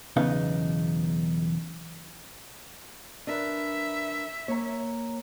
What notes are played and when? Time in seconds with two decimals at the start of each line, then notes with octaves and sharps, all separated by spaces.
0.17 B1 E2 C#3 B3 D#4 F5
3.27 D4 A#4 B4 E5
4.48 A#3 C#5 A#5